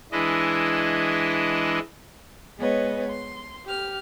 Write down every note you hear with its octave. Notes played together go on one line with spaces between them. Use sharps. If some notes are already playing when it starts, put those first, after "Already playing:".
E3 G#3 D4 E4 D#5
G#3 B3 G#4 B4 C#5 D#5
C6
G4 F6